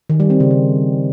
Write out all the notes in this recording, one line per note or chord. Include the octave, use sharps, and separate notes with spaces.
D#3
G3
C4
C#3
C#3